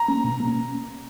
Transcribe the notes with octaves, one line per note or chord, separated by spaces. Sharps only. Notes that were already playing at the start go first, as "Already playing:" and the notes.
Already playing: A#5
A#3 C#4
B2
A#3 C#4